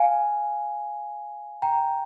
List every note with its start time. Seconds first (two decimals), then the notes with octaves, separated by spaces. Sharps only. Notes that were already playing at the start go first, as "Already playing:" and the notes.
Already playing: F5 G#5
1.62 G5 A#5